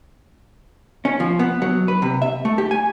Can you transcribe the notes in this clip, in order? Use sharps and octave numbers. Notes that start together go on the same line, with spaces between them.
C#4
F3
B3
F#3
B4
C3
E5
A3
G4
G#5